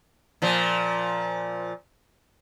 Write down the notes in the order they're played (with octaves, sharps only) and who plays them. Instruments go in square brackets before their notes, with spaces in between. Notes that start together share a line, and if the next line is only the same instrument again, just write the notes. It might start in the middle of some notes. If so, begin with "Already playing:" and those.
[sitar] A#2 F3